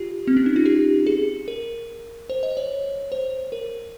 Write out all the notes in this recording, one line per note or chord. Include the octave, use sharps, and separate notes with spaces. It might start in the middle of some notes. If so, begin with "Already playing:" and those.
Already playing: F4 G4
C4
C#4
D#4
F4
G4
G#4
A#4
C5
D#5
C#5
C5
A#4